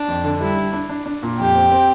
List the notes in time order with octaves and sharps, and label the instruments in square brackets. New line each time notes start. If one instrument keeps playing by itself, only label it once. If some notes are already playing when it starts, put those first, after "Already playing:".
Already playing: [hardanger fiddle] D4
[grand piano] F2
D3
[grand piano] G3 [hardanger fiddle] E4
[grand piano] D4
D4
D4
D4
A#2
[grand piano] F2 [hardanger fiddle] G4
[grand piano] C4
C4